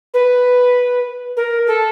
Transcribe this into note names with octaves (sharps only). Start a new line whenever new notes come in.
B4
A#4
A4